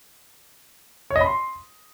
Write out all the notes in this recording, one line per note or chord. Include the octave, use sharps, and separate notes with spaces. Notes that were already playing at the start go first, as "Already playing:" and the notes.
C#5
D#5
B5
C6